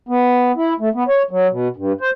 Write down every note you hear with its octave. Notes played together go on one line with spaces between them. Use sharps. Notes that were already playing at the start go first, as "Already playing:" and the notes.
B3
E4
A3
B3
C#5
F#3
B2
G2
C5